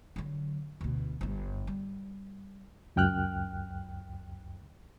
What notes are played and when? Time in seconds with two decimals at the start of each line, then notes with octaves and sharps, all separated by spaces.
0.16 D3 F#3
0.81 D2 B2
1.21 G1 G2
1.67 G3
2.96 C#2 F#2 G5 F6 F#6